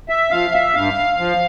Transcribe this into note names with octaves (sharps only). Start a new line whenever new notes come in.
E5
F3 F5
E5
G2 F5
F3